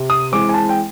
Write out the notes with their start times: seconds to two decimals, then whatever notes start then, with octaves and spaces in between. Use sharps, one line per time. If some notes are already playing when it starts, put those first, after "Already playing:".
Already playing: C3
0.10 D#6
0.32 E3 G#3 C4 D6
0.49 G#5
0.54 A5
0.69 G5